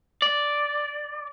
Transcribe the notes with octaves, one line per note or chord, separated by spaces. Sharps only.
D5